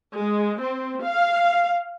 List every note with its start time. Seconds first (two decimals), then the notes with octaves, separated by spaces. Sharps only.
0.15 G#3
0.61 C4
1.04 F5